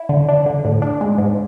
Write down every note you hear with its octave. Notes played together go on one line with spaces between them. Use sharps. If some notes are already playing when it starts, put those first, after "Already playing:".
Already playing: E4
D3
D4
D3
A2
D4
G#3
G#2